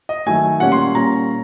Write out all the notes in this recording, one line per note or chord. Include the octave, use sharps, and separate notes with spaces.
D#5
D#3 F#3 A3 G#5
A#2 G3 A#3 C#4 F#5
C6
A#2 G3 A#3 C#4 A#5